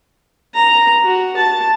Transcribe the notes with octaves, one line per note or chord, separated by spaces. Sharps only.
A#5
F#4
A5